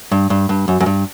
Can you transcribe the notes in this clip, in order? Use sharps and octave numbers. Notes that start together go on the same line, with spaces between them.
G2
G2
G2
F#2
F#2
G2